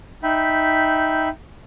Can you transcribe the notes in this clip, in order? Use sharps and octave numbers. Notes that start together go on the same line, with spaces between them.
D#4 E5 G5 B5